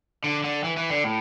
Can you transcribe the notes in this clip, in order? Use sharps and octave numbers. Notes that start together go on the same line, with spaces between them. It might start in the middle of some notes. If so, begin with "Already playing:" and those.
D3
D3
E3
E3
D3
A2